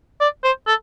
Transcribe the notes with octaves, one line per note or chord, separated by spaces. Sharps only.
D5
C5
A4